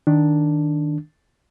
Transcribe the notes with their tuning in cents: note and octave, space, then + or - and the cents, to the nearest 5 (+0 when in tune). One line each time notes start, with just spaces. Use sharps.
D#3 +0 D4 +0